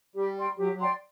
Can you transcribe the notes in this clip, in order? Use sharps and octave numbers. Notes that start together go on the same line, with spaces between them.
G3 G4
D5 G5 C6
F#3 G4
F#3
D5 G5 C6